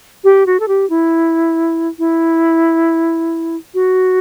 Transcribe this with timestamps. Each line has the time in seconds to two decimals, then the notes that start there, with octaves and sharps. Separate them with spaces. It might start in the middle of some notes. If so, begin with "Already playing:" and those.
0.24 G4
0.46 F#4
0.60 A4
0.68 G4
0.90 E4
1.99 E4
3.74 F#4